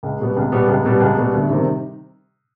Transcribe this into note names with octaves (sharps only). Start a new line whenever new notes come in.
C#2
B2 G3 B3
C#2
B2 G3 B3
C#2
B2 G3 B3
C#2
B2 G3 B3
D2
C3 D#3 G3 C4